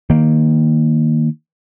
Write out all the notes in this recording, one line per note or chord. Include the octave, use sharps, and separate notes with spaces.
D#3 A#3